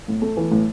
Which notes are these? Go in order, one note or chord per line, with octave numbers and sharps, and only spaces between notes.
A2
A3
E3
A2